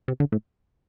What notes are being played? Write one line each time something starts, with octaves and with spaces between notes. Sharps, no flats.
C3
D3
A2